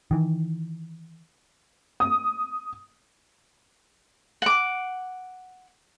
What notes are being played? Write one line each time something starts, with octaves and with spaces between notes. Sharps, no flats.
D#3 E3
D#6
F#5 D6